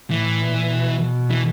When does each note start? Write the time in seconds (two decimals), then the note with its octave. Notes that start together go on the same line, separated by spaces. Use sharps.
0.10 A2 E3
0.40 A#2
0.70 B2
1.30 E3